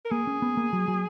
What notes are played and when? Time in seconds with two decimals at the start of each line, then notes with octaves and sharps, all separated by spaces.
0.05 A#4
0.11 A#3 G#4
0.27 C#4
0.42 B3
0.57 A#3
0.73 F#3
0.88 F#3